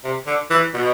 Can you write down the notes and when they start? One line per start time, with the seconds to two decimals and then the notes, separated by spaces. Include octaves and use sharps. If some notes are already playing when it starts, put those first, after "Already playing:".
0.04 C3
0.27 D3
0.50 E3
0.74 B2